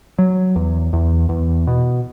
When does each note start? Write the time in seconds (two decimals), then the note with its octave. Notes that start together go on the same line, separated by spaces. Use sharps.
0.19 F#3
0.56 E2
0.93 E2
1.29 E2
1.67 B2